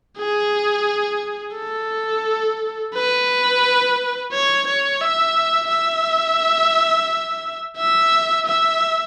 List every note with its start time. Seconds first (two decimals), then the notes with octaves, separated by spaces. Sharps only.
0.18 G#4
1.56 A4
2.94 B4
4.32 C#5
4.67 C#5
5.01 E5
5.69 E5
7.77 E5
8.46 E5